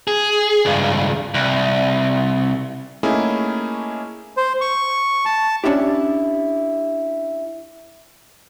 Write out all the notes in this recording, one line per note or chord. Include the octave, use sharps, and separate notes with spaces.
G#4
C#2 G2
C2
A3 A#3 C#4 D#4 E4 G#4
C5
C#6
A5
C#4 D4 E4 G4